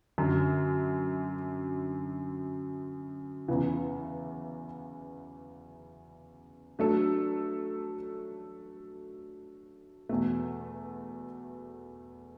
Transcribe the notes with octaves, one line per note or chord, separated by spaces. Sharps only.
F#2 D3 F#3
E2 C#3 E3
F#3 A3 D4 A4
E2 B2 A3